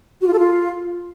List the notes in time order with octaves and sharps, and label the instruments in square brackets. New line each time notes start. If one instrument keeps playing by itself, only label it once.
[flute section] F#4
F4
A4
F4